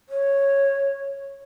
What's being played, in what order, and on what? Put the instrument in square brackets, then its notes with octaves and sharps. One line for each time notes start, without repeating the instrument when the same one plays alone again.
[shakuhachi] C#5